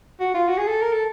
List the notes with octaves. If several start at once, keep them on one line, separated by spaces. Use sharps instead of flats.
F#4
F4
F#4
G#4
A4
A#4
A4